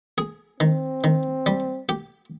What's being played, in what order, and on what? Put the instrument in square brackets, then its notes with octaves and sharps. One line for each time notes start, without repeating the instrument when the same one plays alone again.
[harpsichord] G#4
[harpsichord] D#3 [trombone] C4
[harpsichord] D#3
G3
G4